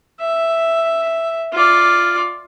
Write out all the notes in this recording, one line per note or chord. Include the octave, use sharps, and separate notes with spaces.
E5
F4 D5